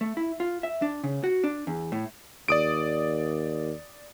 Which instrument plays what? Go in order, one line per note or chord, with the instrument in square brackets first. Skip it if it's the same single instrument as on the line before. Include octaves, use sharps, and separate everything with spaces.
[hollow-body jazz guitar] A3
E4
F4
E5
D4
C#3
F#4
D4
E2
A2
[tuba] D#2 [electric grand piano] D5 D#6 D7